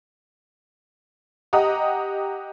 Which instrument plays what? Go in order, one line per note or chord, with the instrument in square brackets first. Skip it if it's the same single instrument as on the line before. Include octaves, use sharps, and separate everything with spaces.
[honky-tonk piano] G4 D#5 F#5 A#5 D#6